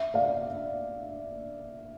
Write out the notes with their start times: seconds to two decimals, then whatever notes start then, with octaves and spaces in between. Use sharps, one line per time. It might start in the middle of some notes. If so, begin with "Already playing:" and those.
Already playing: E5
0.14 D5 F5